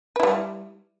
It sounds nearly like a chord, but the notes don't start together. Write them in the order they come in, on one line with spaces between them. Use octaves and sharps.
B4 E4 G3